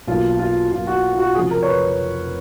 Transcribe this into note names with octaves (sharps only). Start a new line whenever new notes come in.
B1 B2 A#3 F4
F4
B1 B2 A#3 F4
F#4
F4
F#4
F1 F2 C#3 G#4
A#4
C#5
B4